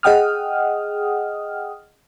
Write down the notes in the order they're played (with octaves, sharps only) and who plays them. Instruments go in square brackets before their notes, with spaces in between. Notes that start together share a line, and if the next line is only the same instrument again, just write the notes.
[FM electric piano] G#4 D#5 F#5 G5 D#6 F6